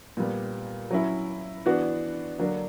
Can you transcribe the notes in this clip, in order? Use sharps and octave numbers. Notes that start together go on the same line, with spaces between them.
A#2 G3 B3
F#3 C#4 E4
E3 B3 D4 F#4
D3 F#3 A#3 D4